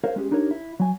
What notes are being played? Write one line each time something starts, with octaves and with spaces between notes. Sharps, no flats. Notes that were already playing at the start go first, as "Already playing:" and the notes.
A#4 C5 C#5 F5
G#3 C#4 G4 G#4
D4 D#4 G4 A#4 C#5
E4
F#3 G#5